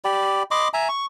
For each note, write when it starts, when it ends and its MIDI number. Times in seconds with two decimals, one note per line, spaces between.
0.04 0.43 67
0.04 0.43 74
0.04 0.43 83
0.51 0.68 75
0.51 0.68 83
0.51 0.68 84
0.51 0.68 86
0.74 0.88 76
0.74 0.88 80
0.74 0.88 82
0.89 1.06 85